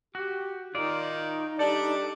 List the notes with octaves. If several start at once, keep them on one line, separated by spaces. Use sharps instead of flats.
F#4 G4
D#3 D#4 F4 D5
G3 D4 A4 D5